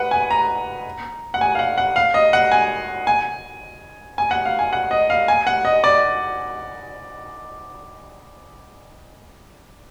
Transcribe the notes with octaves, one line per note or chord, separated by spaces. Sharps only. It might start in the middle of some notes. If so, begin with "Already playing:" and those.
Already playing: B4 F#5
G#5
A#5
F#5
G#5
F5
F#5
F#5
F5
D#5
F#5
G#5
G#5
G#5
F#5
F5
G#5
F#5
D#5
F5
G#5
F#5
D#5
D5